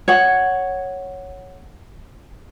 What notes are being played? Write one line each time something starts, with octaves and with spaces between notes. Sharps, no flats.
C#5 F#5